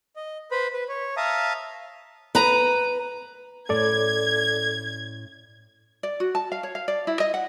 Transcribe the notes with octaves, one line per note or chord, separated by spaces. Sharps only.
D#5
B4 C5 B5
B4
C#5
E5 F5 A5 A#5 D#6
B4 A#5
A2 C#4 A4 D5 G#6
D5
F#4
A5
F5
C#5
F5
D5
E4
D#5
F#5